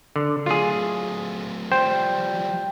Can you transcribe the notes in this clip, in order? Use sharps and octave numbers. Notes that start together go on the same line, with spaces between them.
D3
F#3 A3 F4 G#4
F3 G3 C5 G5